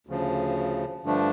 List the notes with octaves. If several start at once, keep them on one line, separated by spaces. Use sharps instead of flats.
D2 C#3 F3
G2 D3 F3 A3 D4